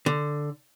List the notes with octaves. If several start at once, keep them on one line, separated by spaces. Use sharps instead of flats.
D3